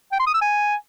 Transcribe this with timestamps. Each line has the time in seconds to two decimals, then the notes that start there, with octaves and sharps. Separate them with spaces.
0.12 G5
0.19 C6
0.27 D#6
0.34 E6
0.41 G#5